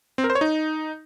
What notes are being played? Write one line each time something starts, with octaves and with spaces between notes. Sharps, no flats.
C4
A#4
C5
C#5
D#4